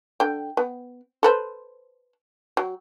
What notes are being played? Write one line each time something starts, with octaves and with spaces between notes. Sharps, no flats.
D3 G5
B3
A4 B4 C5
F#3